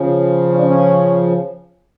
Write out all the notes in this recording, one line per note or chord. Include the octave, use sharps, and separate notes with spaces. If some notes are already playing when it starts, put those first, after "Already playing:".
Already playing: C#3 F3
C#4
D4
C#4